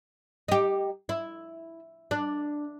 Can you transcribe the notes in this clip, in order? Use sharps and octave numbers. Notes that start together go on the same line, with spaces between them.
D#4 G4
E4
D4